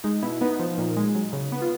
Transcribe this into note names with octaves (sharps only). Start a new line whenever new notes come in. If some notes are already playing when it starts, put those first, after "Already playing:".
G#3 D#4
B2 E4
B3 D#4
F3
A#2
G#3
F#3
C#3
B3
F4